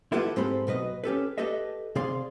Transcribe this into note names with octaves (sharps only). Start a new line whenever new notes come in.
E4 F4 G4 A4 B4 F#5
G#2 G#3 C4 G4 A4 B5
B1 B2 B4 D#5
C#4 G4 A4 B4
G4 A4 B4 D#5 E5
C3 G#4 D5 F5 C6